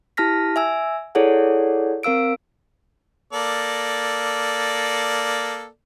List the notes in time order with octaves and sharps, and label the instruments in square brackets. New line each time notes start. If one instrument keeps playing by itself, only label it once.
[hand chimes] E4 G4 A5 F6 A#6 B6
E5 G#5 E6
E4 G#4 A4 C#5 D5 F#5
C4 A#4 F5 E6 D7
[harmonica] A#3 A4 D5